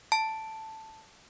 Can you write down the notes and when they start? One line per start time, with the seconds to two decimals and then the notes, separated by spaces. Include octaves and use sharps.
0.12 A5